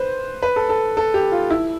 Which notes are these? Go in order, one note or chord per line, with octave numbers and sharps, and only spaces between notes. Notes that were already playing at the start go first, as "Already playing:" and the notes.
Already playing: B4 C5
B4
A4
A4
A4
G4
F4
E4